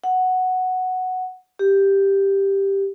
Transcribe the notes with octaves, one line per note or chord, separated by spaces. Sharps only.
F#5
G4